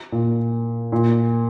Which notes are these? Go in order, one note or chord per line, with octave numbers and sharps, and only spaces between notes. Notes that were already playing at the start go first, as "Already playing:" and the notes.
A#2
A#2